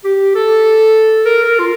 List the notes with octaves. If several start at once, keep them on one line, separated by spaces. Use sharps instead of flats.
G4
A4
A#4
A#4
F4